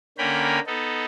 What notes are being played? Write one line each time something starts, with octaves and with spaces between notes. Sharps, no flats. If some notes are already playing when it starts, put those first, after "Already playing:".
D3 A#3 C#4 A#4 G5 B5
B3 D#4 A4